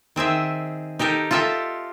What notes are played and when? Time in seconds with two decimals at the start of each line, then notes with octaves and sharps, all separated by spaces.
0.16 D#3 C4 G#4 E5
0.99 D#4 G4 A4 A#4
1.31 F4 G4 A4 D#5 E5